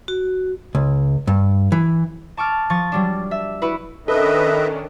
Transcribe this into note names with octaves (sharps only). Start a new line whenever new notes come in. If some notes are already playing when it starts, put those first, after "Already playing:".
F#4
C#2
G2
E3
A5 C#6 D6 F6
F3 C#6 A6
F#3 G3 D4
E5
E4 F#4 B4
D#3 C#4 D4 A4 B4 D#5 E5